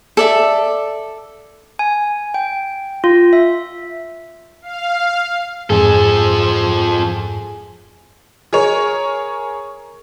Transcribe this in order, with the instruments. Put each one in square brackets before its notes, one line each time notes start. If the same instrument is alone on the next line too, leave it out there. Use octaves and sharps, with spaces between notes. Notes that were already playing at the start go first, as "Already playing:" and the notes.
[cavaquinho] A4 D5 E5
[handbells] G#5
G5
F4
E5
[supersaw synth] F5
[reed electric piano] F2 G#2 [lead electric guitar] F3 A4 [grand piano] G#4
[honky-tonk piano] G#4 A#4 C#5